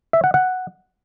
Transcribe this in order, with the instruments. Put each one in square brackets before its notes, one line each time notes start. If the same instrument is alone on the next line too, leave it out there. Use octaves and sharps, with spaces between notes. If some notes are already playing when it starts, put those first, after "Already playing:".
[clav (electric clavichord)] E5
F#5
F#5